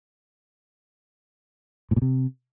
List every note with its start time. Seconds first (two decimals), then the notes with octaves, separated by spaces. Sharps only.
1.91 A2
1.96 A#2
2.02 C3